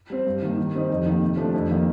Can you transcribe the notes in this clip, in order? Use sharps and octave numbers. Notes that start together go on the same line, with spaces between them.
G3 C4
G2
D#3 A#3
D#3
G3 C4 D#4
F2
D#3 G3 A#3
C3
F3 A3 D4
F2
D#3 A#3